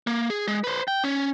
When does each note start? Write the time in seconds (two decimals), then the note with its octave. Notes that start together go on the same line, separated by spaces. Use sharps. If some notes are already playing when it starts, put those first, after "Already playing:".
0.07 A#3
0.30 G#4
0.48 G#3
0.64 B4 C5
0.88 G5
1.04 C#4